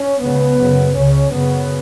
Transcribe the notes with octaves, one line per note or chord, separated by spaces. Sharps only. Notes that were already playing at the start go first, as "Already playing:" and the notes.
Already playing: C#4
C#2 C#3 B3
F#2 C#3
C#2 C#3 C#4
F#2 C#3 B3